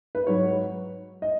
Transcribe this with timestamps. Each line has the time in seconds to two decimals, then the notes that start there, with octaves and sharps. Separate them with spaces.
0.15 B4
0.27 G#2 F#3 C#5
1.22 D#5